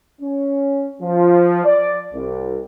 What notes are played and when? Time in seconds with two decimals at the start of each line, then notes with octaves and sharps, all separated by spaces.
0.21 C#4
1.02 F3
1.65 D5
2.14 C2